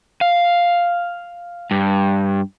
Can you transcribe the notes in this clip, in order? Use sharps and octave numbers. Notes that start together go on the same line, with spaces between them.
F5
G2